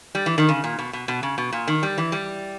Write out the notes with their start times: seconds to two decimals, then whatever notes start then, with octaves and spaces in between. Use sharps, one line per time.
0.15 G3
0.26 E3
0.38 D#3
0.49 C#3
0.64 A#2
0.79 B2
0.93 B2
1.08 B2
1.23 C#3
1.38 B2
1.53 A#2
1.68 D#3
1.83 G3
1.98 E3
2.12 G3